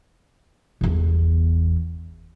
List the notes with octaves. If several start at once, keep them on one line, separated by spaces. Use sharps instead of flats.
G1 E2